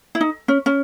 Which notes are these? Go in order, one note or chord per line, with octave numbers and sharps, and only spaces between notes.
E4
D#4
C#4
C#4